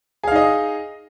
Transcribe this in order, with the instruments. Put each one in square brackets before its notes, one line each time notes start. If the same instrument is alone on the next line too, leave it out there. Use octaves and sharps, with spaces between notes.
[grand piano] G#4
F5
D#4
D#5